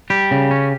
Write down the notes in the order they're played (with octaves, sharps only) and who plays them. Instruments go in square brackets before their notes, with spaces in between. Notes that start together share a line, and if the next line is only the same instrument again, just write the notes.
[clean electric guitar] G3 G4
C#3
C#4